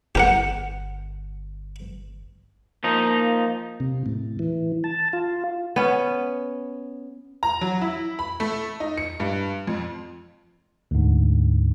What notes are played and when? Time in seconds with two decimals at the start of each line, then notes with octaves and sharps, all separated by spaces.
0.15 G1 G4 A#4 F#5
2.84 F3 A#3 D#4
3.80 C3
4.06 A2
4.39 E3
4.84 A5
5.13 F4
5.76 B3 C#4
7.43 A#5
7.61 F#3
7.81 E4
8.19 B5
8.40 A3
8.80 D#4
8.97 C#7
9.20 G2
9.67 F2
10.91 D2 G#2